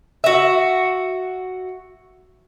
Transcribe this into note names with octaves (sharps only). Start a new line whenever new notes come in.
F#4 E5